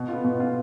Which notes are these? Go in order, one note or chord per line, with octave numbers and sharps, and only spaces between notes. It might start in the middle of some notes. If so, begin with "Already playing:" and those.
Already playing: B2
B3 F4
B2
B3 F4